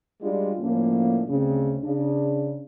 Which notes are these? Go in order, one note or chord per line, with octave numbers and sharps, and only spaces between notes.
G3 G#3 D4 F4 F#4
A2 D3 F3 A#3 C#4
D2 C#3 C4
C#3 D4